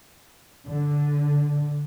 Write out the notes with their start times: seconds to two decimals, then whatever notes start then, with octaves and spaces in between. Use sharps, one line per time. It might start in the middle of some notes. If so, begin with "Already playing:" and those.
0.67 D3